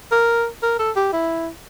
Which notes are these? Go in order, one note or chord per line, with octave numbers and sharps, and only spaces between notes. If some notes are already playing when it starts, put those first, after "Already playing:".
A#4
A#4
A4
G4
E4